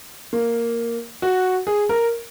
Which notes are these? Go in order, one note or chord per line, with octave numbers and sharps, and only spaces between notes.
A#3
F#4
G#4
A#4